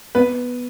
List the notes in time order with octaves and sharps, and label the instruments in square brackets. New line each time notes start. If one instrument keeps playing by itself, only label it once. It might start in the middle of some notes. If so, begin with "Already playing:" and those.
[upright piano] B3 B4